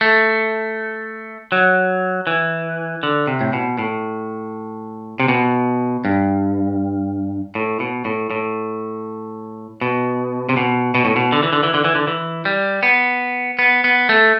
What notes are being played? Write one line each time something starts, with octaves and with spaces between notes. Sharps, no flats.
A3
F#3
E3
D3
C3
A2
B2
A2
C3
B2
G2
A2
B2
A2
A2
B2
C3
B2
B2
A2
B2
D3
E3
D3
E3
D3
E3
D3
E3
G3
B3
B3
B3
A3